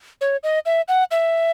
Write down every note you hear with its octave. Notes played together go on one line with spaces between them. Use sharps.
C#5
D#5
E5
F#5
E5